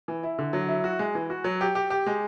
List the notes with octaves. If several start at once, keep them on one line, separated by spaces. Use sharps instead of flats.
E3
E4
D3
F#3
E4
F#4
G#3
E3
F#4
F#3
G4
G4
G4
G#3